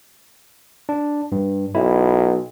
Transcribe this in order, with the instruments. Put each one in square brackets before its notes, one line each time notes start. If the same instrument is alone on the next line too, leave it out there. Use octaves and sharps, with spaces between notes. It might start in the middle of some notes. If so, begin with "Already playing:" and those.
[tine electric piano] D4
G2
[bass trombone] B1 [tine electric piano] E4